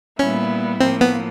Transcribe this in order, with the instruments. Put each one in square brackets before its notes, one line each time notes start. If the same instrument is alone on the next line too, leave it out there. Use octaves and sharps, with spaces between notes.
[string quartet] A#2 G3 B3 E4 [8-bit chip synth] C#4
[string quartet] A2 F3 A#3 [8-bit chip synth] C4
[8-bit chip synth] B3